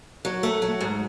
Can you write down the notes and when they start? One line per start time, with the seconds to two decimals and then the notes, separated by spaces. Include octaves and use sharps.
0.25 F#3
0.43 A3
0.62 F#3
0.81 G#2